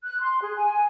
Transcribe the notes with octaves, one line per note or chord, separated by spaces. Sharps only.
F#6
C6
G#4
G#5